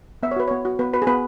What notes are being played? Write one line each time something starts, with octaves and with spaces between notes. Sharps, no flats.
B3 E5
C#5
F#4 B4
B3 C#5
F#4
B3 B4
F#4 B4
G#4
B3 B4